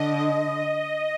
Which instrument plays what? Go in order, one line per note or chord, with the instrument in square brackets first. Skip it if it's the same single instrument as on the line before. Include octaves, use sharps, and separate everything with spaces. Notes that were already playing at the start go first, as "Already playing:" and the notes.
Already playing: [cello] D3 [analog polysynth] D#5